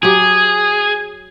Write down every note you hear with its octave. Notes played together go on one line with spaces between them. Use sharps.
F#3 G4 G#4 G#5